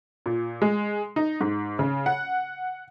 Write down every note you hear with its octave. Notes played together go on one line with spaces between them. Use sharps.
A#2
G#3
D#4
G#2
C#3
F#5